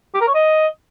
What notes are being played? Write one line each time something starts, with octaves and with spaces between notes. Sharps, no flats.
G4
A#4
C#5
D#5